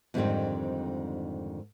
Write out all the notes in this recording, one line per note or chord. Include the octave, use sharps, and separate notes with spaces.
F2 G#2 D3 D#3 G3 C4